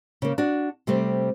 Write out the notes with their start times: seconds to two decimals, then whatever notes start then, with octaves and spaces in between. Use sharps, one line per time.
0.22 C#3 A#3
0.38 D4 F#4
0.87 C3 G3 A3 C4